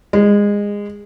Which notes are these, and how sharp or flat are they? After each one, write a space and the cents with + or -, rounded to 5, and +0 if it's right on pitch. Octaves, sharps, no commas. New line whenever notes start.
G#3 -20